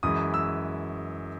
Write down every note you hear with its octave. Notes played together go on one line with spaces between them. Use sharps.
F#2 E3 G#3 D#6
E6